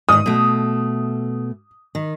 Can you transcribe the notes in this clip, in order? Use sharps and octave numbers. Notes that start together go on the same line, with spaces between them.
G#2 D#3 D#6
B2 A3
D#3